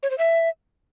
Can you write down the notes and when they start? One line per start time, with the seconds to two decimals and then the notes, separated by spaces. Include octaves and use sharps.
0.03 C#5
0.10 C5
0.18 E5